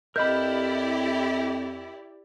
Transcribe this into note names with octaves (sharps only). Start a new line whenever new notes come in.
F2 E4 G4 A#4 D5 D#5 B5 G6